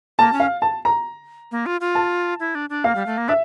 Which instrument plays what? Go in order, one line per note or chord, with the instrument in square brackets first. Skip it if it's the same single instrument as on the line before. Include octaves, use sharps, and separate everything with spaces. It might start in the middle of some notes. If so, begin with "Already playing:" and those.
[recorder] A#3 [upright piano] A5
[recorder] C#4
[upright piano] F5
A5
A#5
[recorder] A#3
F4
F4
[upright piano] A5
[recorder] E4
D4
D4
[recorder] A#3 [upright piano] F5
[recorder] G3
A3
A#3
[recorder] D4 [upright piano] E5